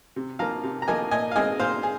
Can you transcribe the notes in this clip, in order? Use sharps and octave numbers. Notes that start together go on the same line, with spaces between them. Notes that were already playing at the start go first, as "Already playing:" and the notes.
C3
F3 A#3 F5 A#5
C3
A#5
F3 A#3 D#5 G#5
A#2 D#5 G#5
F5
G#3 C4 D#5 G#5
A#2 C5 F5
G#4